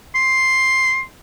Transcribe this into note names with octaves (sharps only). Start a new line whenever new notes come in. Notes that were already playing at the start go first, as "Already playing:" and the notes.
C6